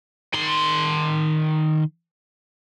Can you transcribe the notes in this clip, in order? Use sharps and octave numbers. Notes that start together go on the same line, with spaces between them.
D#3 C6